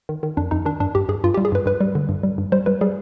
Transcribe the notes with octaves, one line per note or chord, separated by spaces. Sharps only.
D#3
D#3
F2 D4
F2 D#4
D#3 D4
G2 D4
G2 G4
G2 G#4
G2 F4
G4
G3
G#4
G2 B4
G2 B4
G3
D3
G2
G3
G2
G3 C5
G3 B4
G3 G#4